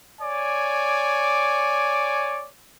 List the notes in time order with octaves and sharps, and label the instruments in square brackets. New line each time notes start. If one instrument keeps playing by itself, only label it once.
[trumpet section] C#5 D5 G#5 D6